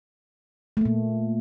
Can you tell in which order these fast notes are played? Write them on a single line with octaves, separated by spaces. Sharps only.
A3 A#3 A#2